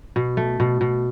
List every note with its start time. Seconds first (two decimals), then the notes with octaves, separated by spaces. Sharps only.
0.16 B2
0.37 A3
0.60 B2
0.81 B2